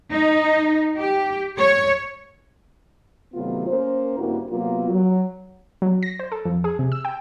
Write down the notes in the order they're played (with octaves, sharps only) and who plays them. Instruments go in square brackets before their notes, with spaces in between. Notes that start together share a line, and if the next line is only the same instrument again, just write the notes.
[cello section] D#4
G4
C#5
[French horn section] C3 D#3 F#3 A3 B3 F4
A#3 C#4 A#4 C5
G2 C#3 A#3 C4 E4 F#4
C3 F#3 A#3 B3 F4
F#3
[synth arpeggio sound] F#3
A#6
C5
A4
F2
G#4
C3
E6
G5